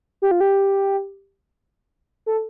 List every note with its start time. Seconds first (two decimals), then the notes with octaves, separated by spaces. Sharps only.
0.22 G4
0.31 F4
0.41 G4
2.26 A4